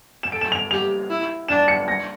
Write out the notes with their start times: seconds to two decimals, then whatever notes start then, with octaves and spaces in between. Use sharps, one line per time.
0.23 E7
0.32 A4 D7
0.41 E7
0.52 F7
0.71 G4 F7
1.10 E4
1.48 D4 E7
1.68 C#7
1.88 A#6